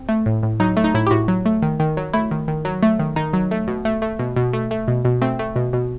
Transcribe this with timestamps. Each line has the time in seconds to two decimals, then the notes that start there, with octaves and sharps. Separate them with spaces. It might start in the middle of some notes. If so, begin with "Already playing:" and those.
Already playing: C4
0.09 A3
0.26 A2
0.43 A2
0.60 F#3 D#4
0.77 A3
0.84 D#4
0.94 A2 E4
1.07 G4
1.11 A2 F#4
1.28 F#3
1.46 A3
1.62 D#3
1.80 D#3
1.97 F#3
2.13 A3 E4
2.31 D#3
2.48 D#3
2.65 F#3
2.83 A3
2.99 D#3
3.16 D#3 D#4
3.33 F#3
3.51 A3
3.68 B2
3.85 A3
4.02 A3
4.19 B2
4.36 B2
4.53 A3
4.71 A3
4.88 B2
5.05 B2
5.22 A3 C4
5.39 A3
5.56 B2
5.73 B2